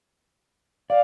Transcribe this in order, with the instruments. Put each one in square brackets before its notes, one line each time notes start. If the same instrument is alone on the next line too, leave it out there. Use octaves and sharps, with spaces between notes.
[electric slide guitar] D5 [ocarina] F5